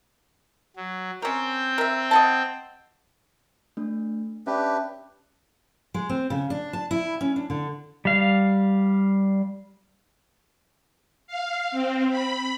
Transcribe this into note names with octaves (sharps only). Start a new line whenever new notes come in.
F#3
C4 C#4 A#4 G5
A#4 E5
D#5 F#5 A5
A3 D4
C#4 D4 G4 B4 E5
G#3
C4
C#3
D4
A5
E4
C#4
D4
D3
G3 F5
F5
C4
B5